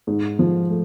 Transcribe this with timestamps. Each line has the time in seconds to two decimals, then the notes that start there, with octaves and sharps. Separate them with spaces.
0.07 G#2
0.39 F3
0.69 A3